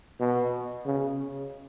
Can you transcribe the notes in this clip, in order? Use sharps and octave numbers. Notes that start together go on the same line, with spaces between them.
B2
C#3